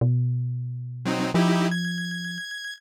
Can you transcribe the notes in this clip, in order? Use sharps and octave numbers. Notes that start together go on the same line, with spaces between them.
B2
F#3 C4 D#4
F3 D#4 E4 G4
G#6